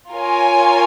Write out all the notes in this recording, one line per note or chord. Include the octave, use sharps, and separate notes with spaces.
F4 A#4 C#5 G#5